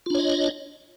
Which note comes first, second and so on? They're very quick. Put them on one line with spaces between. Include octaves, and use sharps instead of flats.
F4 D4 C#5 D#5